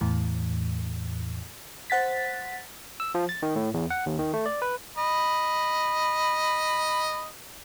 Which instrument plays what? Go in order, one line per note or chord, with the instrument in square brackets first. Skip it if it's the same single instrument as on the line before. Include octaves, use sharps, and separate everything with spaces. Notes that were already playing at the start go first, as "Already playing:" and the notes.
[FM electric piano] E2 A2 E3
C5 F#5 A6 B6
[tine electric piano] E6
F3
A6
D#3
A2
E2
F#5
D#2
D#3
A3
D5
B4
[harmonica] D#5 B5